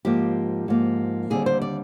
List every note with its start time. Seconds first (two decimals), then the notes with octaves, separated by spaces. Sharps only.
0.05 G#2 F3 A#3 G4
0.68 G#2 F3 A#3
1.30 D#2 D3 G3 C4 G#4
1.46 C5
1.62 D5